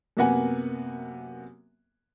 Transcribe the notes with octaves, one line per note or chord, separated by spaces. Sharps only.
F#2 C3 A#3 B3 F#5 G#5